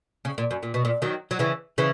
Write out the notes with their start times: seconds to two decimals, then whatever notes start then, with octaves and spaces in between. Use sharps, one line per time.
0.25 C#3
0.38 A#2
0.51 F#2
0.63 A#2
0.74 B2
0.85 A#2
1.02 D#3 F#3
1.31 F#3
1.39 C#3 E3
1.78 C#3 E3